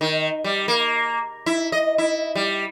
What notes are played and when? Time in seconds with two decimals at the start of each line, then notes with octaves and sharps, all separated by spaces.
0.01 D#3
0.44 G3
0.68 A#3
1.46 E4
1.72 D#5
1.98 E4
2.35 G3